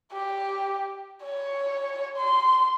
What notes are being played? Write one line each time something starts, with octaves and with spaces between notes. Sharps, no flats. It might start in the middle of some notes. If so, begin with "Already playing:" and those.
G4
C#5
C6